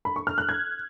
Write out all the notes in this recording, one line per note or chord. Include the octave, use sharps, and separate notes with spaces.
B5
C#6
F6
F#6
G#6